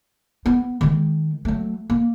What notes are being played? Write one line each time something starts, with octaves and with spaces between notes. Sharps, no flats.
B3
D#3 G#3
F#3 A3
A#3